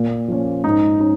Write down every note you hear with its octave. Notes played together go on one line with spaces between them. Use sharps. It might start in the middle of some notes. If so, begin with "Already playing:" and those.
Already playing: A#2
F3 A#3 C#4
G#2 D#4
C#4 D#4